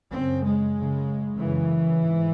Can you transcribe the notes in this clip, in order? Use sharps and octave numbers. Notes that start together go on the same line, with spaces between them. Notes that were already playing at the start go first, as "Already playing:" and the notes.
F#2 C#3 C4
G#3
F#2 C#3
F#2 C#3 E3
G#2